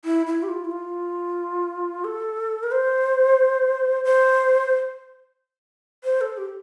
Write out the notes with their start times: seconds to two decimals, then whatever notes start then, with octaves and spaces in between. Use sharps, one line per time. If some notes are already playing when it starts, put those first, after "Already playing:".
0.05 E4
0.26 E4
0.43 G4
0.49 F4
0.65 E4
0.71 F4
2.04 A4
2.63 A#4
2.71 C5
4.04 C5
6.04 C5
6.21 A4
6.37 G4